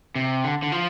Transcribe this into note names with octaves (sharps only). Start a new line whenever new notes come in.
C3
D3
D3
F3